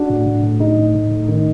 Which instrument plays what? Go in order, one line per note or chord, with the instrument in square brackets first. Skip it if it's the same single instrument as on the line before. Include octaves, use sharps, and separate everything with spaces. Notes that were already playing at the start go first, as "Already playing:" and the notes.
Already playing: [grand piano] D4 F#4
A2
A2
A2
A2 D#4
A2
A2
A2
D#3